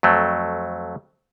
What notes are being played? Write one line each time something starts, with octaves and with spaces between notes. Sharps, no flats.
F2 F#3 A3